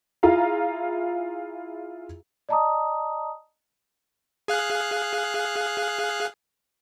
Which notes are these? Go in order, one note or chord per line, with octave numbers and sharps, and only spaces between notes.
E4 F4 G#4 F5 A#5
D5 D#5 A5 A#5 D6 D#6
G#4 F5 F#6